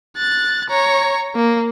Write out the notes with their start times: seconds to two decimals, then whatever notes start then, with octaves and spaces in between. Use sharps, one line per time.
0.17 F#6 A6
0.69 C#5 A#5
1.35 A#3